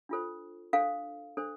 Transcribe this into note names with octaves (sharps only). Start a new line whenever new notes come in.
D4 F4 A4 C5
D4 A4 C5 F5
D4 A4 C5